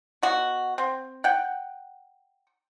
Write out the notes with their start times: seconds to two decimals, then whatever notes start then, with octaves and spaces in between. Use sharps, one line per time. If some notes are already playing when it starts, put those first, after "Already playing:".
0.23 B2 F#4
0.78 C4
1.24 F#5 G5